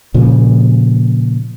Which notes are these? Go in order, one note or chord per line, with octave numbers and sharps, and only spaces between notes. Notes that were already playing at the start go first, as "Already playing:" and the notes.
A#2 C#3 F3